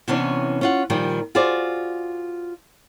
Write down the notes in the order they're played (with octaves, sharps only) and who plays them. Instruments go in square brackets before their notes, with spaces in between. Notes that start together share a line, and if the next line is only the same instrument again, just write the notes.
[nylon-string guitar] C3 E3 B3 C#4 D4 C#5
C#4 F4 F#5
A#2 D#3 F3 G3
F4 F#4 G#4 C5 D5